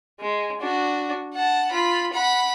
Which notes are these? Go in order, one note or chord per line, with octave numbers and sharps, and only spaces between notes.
G#3
D4 F#4
F#5 A5
F4 B5
F#5 B5